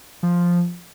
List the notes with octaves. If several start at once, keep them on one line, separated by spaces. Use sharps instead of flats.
F3